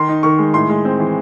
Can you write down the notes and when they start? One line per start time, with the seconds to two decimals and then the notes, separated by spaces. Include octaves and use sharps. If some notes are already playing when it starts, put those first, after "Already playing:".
Already playing: D#3 C6
0.09 D#4
0.23 D#3 C#6
0.39 G#3
0.54 A2 C6
0.69 G#3
0.85 C4
1.00 E3